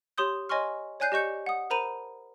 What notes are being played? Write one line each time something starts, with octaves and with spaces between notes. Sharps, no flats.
G4 C#5 C6 D#6 G6
C#5 D#5 G#5 C6 C#6 F6
C#5 D5 G#5 F#6 G6 C7
G4 D#5 C#6 G6 C#7
F#5 D#6
A#4 C5 A#5 B5 D#7